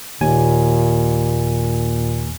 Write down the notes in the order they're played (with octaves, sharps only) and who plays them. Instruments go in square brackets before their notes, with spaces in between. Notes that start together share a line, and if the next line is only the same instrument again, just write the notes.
[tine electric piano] D#2 G#5 [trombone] A#2